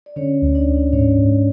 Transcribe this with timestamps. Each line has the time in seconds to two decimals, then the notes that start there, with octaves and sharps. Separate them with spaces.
0.06 D5
0.16 D3 C#4 C#5
0.42 D2
0.55 D4 D5
0.68 D2
0.93 G#2 C#4 C#5
1.18 G#2